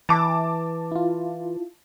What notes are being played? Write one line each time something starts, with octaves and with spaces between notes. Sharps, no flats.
E3 A5 D6
E4 F4